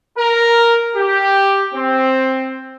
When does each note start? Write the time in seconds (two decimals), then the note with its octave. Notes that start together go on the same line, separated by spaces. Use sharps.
0.17 A#4
0.95 G4
1.74 C4